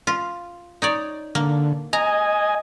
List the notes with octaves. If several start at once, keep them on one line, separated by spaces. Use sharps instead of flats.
F4
D#4 C#5 D5
D3 A#3
D#5 G#5 A#5